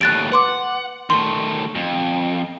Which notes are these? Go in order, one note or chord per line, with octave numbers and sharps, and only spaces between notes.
D#2 A2 F#6 A6 D7
B4 F#5 C6 D6
D#3 A3 C6
F2